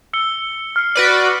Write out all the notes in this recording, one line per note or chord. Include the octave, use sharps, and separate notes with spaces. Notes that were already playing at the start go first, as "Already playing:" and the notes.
E6 C#7 G7
F6 C7 C#7
F#4 B4 D5